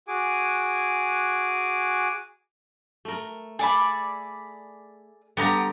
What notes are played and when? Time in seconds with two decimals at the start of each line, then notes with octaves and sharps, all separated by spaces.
0.08 F#4 G#4 G#5 D6
3.05 A3 A#4
3.59 G#4 A4 D5 B5
5.37 D3 G3 B3 G4 A#5